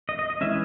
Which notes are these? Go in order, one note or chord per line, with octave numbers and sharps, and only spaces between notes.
D#5
D#5
D#5
E3 G#3 C#4 E5